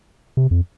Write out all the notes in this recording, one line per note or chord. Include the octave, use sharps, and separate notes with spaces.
C3
F2